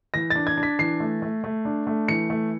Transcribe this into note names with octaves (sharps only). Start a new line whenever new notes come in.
E3 A#6
A6
D4
G#6
D4
B6
E3 C7
A3
A3
A3
D4
A3
E3 C#7
A3